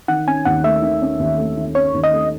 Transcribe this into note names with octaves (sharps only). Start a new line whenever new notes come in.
D#3 F#5
C#4 G#5
D#2 F#5
A3 E5
D#3
C#4
D#2
A3
D#3
C#4 C#5
D#2
D#5
A3